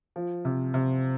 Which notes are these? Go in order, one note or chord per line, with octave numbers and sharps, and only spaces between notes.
F3
C3
C3